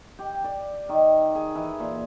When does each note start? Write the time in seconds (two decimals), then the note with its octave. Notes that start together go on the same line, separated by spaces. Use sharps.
0.19 G4
0.44 D5
0.89 D#3
1.35 G#4
1.55 E3
1.80 A#2